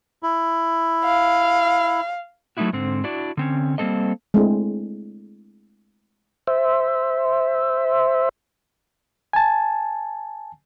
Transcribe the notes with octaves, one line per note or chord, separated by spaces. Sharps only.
E4
F5
F#3 A3 C4 D#4 E4 F#4
G#2 D3 C4
D4 E4 F#4 D5
D3 C4 C#4
G3 A#3 C4 A4 D#5
G#3 A3 C4 D4 E4
C5 E5
G#5 A5